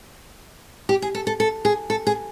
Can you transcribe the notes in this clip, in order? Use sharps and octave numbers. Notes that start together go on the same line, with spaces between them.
G4
G#4
A4
A4
A4
G#4
A4
G#4